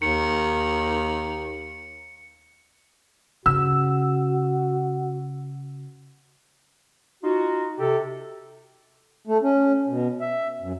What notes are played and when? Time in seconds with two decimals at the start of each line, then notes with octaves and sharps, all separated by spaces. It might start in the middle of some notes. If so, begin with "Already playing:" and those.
0.02 D#2 D#3 C#7
3.46 C#3 F#4 E6
7.23 D#4 F4 F#4
7.78 C3 G4 A4
9.27 A3
9.42 C#4
9.88 B2
10.21 E5
10.60 F#2